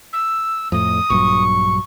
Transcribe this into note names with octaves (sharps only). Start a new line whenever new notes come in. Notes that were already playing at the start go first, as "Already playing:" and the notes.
E6
F2 A2 D#6
A#1 G2 F#3 C#6